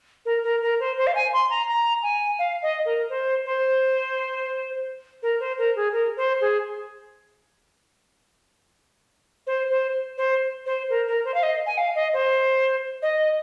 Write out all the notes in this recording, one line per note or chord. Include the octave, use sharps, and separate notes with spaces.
A#4
A#4
A#4
C5
C5
F5
G#5
C6
A#5
A#5
G#5
F5
D#5
A#4
C5
C5
A#4
C5
A#4
G#4
A#4
C5
G#4
C5
C5
C5
C5
A#4
A#4
C5
F5
D#5
G#5
F5
D#5
C5
D#5